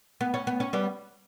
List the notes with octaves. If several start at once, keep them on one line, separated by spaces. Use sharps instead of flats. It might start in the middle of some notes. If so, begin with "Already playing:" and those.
B3
C#4
B3
C#4
G3 B3